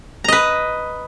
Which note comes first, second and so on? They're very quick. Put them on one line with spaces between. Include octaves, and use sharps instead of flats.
A#5 D#5 B4